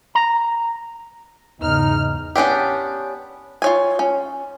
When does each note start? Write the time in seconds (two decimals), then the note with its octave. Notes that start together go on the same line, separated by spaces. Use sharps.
0.15 A#5
1.62 E2 G#2 C#3 D#4 F6
2.36 B3 C#4 D4 G4
3.62 F4 C#5 G#5
3.99 C#4